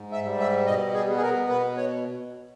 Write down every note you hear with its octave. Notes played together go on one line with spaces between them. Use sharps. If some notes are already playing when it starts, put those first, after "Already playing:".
Already playing: G#2
E5
G3
E5
B2 D#5
G#4
B3
G#4
A#4
B2 B4
C#5